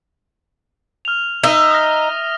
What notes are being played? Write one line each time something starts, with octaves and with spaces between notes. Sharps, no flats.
F6 F7
D#4 E5 D#7 F7 G7
D#6 F6 A#6